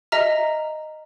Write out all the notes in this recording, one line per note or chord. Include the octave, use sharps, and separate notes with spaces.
D#5 E5 A#5 F6